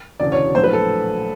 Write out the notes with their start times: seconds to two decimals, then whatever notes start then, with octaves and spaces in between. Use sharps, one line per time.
0.20 E1 D2 C#3 E3 D5
0.32 C#5
0.55 A#1 A2 F#3 A3 C5
0.64 B4
0.73 A4